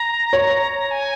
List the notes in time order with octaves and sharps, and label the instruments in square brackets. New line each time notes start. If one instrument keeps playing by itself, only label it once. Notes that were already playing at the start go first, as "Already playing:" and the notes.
Already playing: [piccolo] A#5
[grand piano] C#5
[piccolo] G#5